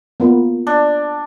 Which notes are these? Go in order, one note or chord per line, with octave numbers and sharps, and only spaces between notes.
A#3 B3 F4
D4